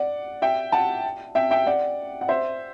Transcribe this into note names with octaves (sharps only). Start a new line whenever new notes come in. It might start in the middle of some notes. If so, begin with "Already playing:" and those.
Already playing: D5 F#5
E5 G5
F#5 A5
E5 G5
E5 G5
D5 F#5
F#5
C5 E5